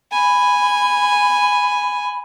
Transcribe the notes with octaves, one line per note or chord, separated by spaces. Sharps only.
G#5 B5